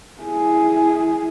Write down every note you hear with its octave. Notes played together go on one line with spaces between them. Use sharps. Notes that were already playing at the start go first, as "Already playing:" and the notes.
E4 G#4